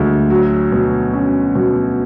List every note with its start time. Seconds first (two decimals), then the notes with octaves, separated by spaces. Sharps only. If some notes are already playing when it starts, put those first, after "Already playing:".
Already playing: D2 G#3
0.30 F#3
0.72 B2
1.13 C#4
1.55 B2